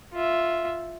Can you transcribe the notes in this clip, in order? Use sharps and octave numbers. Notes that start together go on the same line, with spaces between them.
F4 E5